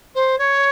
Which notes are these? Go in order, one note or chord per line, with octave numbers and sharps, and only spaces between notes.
C5
C#5